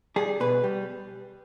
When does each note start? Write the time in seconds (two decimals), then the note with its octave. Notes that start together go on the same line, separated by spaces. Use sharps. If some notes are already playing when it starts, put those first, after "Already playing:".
0.16 G3 G#4
0.40 B2 B4
0.64 G3